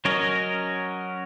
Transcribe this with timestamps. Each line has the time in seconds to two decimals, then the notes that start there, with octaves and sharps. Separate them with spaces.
0.05 F#3 C#4 A#4 C#5 D#5